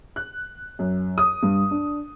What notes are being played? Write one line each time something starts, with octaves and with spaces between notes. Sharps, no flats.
F#6
F#2
D#6
G2
D4